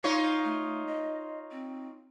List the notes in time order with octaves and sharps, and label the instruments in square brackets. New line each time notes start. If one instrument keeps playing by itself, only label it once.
[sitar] D#4 F4 C#5 [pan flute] F5
[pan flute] A3
D#5
C4